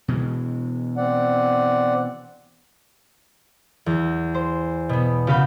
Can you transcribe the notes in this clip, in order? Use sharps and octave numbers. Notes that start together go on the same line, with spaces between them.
B2 E3 G#3
C4 D5 F#5
E2 A#6
C5
B2 B3
C#3 F#4 B4 F5 B5 G6